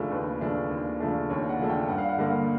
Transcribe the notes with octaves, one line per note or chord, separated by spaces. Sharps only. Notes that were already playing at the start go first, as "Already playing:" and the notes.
Already playing: D#2 C#3 F3 A3 D4
D#2 B4
C#3 F3 A3 D4
D#2
C#3 F3 A3 D4
D#2 C#5
F#5
C#3 F3 A3 D4
G5
G2 F#5
F5
F#5
D3 G3 A#3